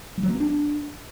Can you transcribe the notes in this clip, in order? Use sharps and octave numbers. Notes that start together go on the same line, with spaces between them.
G3
F#3
A#3
C4
D4